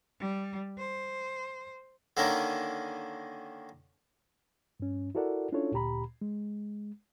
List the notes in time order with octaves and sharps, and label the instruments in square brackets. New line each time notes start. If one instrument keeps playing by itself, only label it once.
[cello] G3
C5
[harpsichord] D3 D#3 A#3 C#4 A#4
[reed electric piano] G2 C#4
E4 F#4 A4 A#4 D5 F#5
C#4 D4 E4 F4 A4 C#5
D2 A#2 G4 A#5 B5
G#3